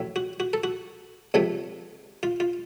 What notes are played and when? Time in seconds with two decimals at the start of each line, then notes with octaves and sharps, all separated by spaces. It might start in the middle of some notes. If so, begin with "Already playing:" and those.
Already playing: A1 A2 F#3 A3
0.16 F#4
0.40 F#4
0.53 A4
0.64 F#4
1.34 C#2 C3 F3 A3
2.23 F4
2.40 F4